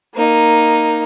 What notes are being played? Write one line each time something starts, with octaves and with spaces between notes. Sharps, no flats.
A#3 D#4